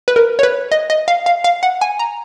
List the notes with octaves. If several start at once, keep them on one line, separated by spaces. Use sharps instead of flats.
B4
A#4
C#5
B4
D#5
D#5
F5
F5
F5
F#5
G#5
A#5